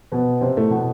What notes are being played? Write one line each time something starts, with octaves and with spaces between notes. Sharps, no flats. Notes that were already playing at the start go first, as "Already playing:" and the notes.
B2 B3
C3 C4
A2 A3
B2 B3